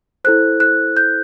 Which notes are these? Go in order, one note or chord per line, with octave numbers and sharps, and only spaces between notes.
E4 A4 C5 F#6
F#6
G6